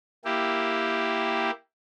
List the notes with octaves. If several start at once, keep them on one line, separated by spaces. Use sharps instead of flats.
A#3 E4 G4